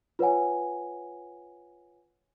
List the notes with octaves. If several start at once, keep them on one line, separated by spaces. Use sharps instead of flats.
F4 B4 C#5 F#5 G#5